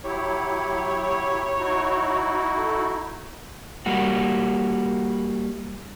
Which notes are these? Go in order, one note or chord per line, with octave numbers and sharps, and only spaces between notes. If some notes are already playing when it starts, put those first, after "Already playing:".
F#3 E4 G4 C#5
D#4 E4 F#4
A4
G3 A#3 F#4